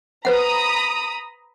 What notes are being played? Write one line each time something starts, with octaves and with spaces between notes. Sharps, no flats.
B4 C5 F#5 A#5 B5 D#6